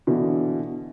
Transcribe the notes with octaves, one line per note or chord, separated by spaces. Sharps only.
B2 D3 E3